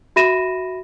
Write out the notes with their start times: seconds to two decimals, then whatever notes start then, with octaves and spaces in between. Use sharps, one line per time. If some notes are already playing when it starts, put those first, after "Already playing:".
0.16 F#4 E5 B5 A#6 D#7 E7